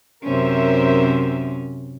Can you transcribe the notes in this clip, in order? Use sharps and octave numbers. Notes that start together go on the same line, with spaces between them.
F#2 C3 C#4 A#4 C5 E5